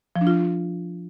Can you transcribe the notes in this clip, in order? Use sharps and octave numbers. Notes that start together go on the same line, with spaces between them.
F3
D4
F4